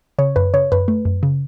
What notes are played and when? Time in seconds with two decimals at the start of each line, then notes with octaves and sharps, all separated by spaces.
0.18 C#3 C#5
0.36 F#2 B4
0.54 C#3 C#5
0.72 F#2 B4
0.88 A3
1.05 F#2
1.23 C#3